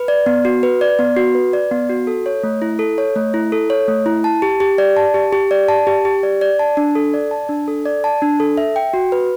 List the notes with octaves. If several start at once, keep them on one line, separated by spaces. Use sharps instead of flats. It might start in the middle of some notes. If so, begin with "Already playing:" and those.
Already playing: B4
D5
B3
F#4
B4
D5
B3
F#4
B4
D5
B3
F#4
A4
C#5
A3
E4
A4
C#5
A3
E4
A4
C#5
A3
E4
A5
G4
G4
D5
A5
G4
G4
D5
A5
G4
G4
D5
D5
A5
D4
A4
D5
A5
D4
A4
D5
A5
D4
A4
E5
G5
F#4
B4